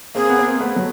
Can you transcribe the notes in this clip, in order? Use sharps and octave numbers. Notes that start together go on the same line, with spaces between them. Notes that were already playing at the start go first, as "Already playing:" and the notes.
A#3 C4 G#4
B3
A#3 C4
A3 B3
F#3